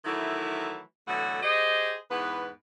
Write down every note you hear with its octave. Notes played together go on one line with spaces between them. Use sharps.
D#3 E3 F#3 A3 E4
B2 D3 E3 F#3 A3 F#4
G4 G#4 C5 D#5
E2 G#2 B3 B4